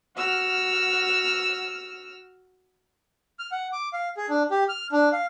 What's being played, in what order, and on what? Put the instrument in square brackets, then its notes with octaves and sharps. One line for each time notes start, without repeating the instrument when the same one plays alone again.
[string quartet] F#4 E6 F6
[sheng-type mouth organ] F6
F#5
D6
F5
G#4
D4
G4
F6
D4
F5